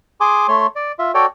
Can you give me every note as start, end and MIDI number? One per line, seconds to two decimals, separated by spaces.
0.21 0.47 68
0.21 0.47 80
0.21 0.47 84
0.21 0.47 86
0.48 0.67 57
0.48 0.67 73
0.48 0.67 84
0.75 0.92 74
0.99 1.12 65
0.99 1.12 76
1.14 1.26 66
1.14 1.26 69
1.14 1.26 73
1.14 1.26 74
1.14 1.26 79